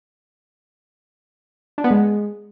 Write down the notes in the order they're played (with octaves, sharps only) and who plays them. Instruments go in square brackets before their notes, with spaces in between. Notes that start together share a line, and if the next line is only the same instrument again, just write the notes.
[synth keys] D4
B3
G#3